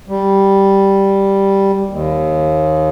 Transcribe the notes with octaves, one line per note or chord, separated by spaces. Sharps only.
G3
D#2